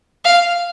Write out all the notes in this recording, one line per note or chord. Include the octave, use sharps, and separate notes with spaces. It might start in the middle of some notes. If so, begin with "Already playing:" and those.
F5